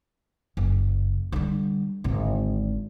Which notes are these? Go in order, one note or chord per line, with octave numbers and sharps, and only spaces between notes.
F#1
D3 G3
G#1 D3